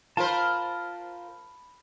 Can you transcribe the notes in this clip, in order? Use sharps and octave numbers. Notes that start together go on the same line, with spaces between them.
F4 A#4 C5 A5 B5